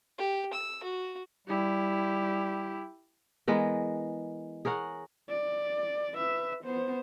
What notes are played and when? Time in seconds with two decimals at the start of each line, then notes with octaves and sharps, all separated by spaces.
0.18 G4
0.53 E6
0.84 F#4
1.47 G3 E4 G4
3.48 E3 G#3 B3 A#4
4.65 G#4 A#4 C#5 F#5
5.29 D5
6.14 B4 E5
6.64 B3 C5